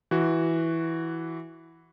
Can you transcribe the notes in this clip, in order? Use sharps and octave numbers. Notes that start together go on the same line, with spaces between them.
E3 F#4